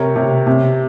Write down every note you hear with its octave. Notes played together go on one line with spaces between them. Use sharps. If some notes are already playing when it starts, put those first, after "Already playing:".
Already playing: C3 A#4 C#5
C3
C3